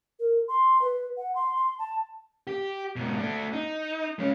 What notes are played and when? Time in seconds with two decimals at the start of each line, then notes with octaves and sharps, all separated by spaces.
0.20 A#4
0.48 C6
0.82 B4
1.17 F#5
1.35 C6
1.56 C6
1.79 A5
2.47 G4
2.96 G#2 B2
3.17 A3 D4
3.53 D#4
4.19 G#3 C#4